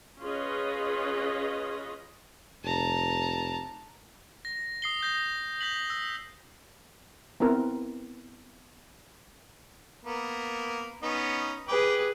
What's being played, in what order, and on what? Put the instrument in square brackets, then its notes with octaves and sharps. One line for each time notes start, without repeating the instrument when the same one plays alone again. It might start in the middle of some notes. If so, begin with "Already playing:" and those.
[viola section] C#4 F4 G#4 B4 C#5 D#5
[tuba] F1 [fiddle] A5 A#5
[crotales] A#6
D#6 C7 G7
D#6 G6 A#6
G6 B6 F#7
E6
[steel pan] B3 C4 E4 A#4
[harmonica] A#3 B3
B3 C#4 D#4
[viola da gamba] G#4 B4 [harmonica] G5 D6